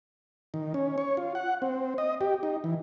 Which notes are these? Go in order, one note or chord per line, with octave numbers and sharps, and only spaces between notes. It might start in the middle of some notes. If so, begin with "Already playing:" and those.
D#3
C#4
C#5
F4
F#5
C4
D#5
G4
D#4
E3